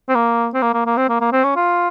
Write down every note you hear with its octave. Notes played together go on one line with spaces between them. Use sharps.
C4
A#3
C4
A#3
A#3
A#3
C4
A#3
A#3
C4
C#4
F4